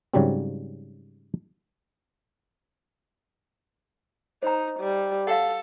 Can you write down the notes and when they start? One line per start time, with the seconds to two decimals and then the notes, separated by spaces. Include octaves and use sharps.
0.14 G#2 C#3 F#3 G3 C4
4.43 D#4 C5 A#5
4.79 G3
5.27 A4 F5 F#5